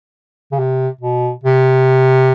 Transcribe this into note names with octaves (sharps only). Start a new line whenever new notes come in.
C#3
C3
B2
C3